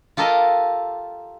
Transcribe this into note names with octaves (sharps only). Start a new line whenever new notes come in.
F4 G4 A4 A#4 D#5